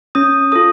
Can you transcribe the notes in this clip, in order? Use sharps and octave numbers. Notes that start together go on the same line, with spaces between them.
C#4 D#6
F4 A4 D#6